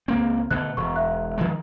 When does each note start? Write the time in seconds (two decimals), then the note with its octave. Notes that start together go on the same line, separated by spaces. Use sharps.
0.08 C#2 A#3 C4
0.51 B2 D3 A3 F#6
0.77 E1 C#6
0.96 E5 F#6
1.38 D#3 F3 G#3